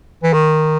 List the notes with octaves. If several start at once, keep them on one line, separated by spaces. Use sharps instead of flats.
E3
D#3